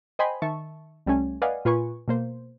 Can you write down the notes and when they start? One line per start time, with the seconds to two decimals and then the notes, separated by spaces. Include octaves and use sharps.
0.19 C5 D#5 G5 G#5 B5 C6
0.42 D#3 E5 A5 C#6
1.06 C2 G3 A3 C#4 G#5
1.42 B4 D5 D#5 F5 F#5 G#5
1.65 A#2 F4 B4 G#5 C#6
2.08 B2 A#3 C5